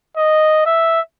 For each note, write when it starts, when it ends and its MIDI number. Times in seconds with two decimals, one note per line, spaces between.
0.17 0.62 75
0.66 1.01 76